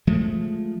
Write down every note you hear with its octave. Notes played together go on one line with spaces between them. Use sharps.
F3 G#3 A3